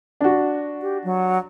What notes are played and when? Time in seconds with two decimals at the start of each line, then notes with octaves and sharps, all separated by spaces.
0.21 D4 F#4
0.82 G4
1.04 F#3